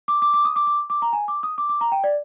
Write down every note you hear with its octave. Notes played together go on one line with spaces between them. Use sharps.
D6
D6
D6
D#6
D6
D6
D6
A#5
G#5
D6
D#6
D6
D6
A#5
G5
D5